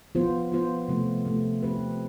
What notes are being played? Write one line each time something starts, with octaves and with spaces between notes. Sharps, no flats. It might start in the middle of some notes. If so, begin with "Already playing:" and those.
F3 B3 F4 C5
F3 B3 F4 C5
C3 F3 A3
C3 F3 A3
F3 C4 G4 B4